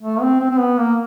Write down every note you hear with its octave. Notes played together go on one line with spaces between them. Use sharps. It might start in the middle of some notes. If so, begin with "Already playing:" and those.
A3
C4
C4
C4
B3
A#3